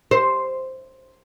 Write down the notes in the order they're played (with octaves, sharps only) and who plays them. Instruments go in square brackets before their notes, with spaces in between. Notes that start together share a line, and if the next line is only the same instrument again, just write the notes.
[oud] C5